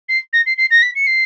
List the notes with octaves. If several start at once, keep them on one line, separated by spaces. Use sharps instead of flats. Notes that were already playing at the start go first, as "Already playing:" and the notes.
C7
A#6
C7
C7
A#6
B6
C#7
C7